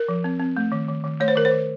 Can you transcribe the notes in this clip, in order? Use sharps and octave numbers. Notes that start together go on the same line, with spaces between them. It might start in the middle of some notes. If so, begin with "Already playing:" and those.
Already playing: A#4
F3
C4
C4
A3
D#3
D#3
D#3
A3 C#5
C5
D#3 A#4
C5
D#3